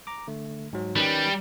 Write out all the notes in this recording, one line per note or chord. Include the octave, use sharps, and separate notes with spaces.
A#5 D6
D3 A3
G#2 F#3
D#3 G3 C#4 B4